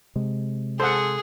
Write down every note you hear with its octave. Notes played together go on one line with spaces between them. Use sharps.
C3 G#3
G#4 A4 C5 F#5